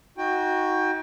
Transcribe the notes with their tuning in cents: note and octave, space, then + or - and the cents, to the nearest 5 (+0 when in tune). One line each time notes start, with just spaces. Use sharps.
D#4 +35 F#4 +0 G5 +15